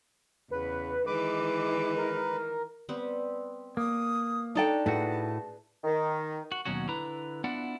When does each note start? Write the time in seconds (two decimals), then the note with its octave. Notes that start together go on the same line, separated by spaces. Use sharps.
0.51 E2 C#3 B4
1.06 D#3 E3 G#3 B4 D6
1.97 A#4
2.89 G3 B3 C4
3.77 A#3 D#6
4.55 D4 D#4 A4 C#5 G5 A5
4.86 A2 A3 F#4 G#4 B4
5.84 D#3
6.52 F#4
6.65 D#2 B2 F#3 C#4 F#4
6.89 D3 E4 B4 A#5
7.44 B3 D4 E4 F4 D5 F#5